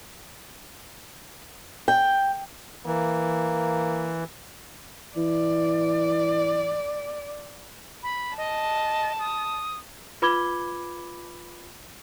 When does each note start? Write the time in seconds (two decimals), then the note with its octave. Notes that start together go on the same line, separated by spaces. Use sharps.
1.88 G5
2.86 E3 A#3
5.17 E3 D5
8.03 B5
8.38 D#5 A5
9.19 D#6
10.22 F4 B4 B5 D6 G#6 G7